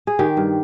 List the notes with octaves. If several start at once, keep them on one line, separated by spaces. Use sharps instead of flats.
G#4
D#3 G4
G2